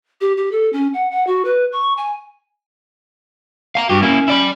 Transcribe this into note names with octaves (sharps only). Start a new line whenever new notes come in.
G4
G4
A4
C#4
F#5
F#5
F#4
B4
C#6
G#5
F5 A5 A#5
G2 F#4 G4
A#3 C#4 E4
E4 D5 B5